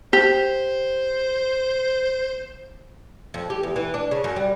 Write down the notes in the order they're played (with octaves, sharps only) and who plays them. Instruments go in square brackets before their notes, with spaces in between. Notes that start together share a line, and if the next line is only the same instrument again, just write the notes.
[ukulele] G4 [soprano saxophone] C5
[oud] F2
G4
E2
E3
D4
C#3
F#2
G3